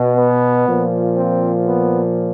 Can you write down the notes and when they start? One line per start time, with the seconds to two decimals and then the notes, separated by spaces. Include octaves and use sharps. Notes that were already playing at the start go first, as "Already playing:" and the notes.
Already playing: B2
0.16 B3
0.67 A#2 F3
1.17 C4
1.67 B3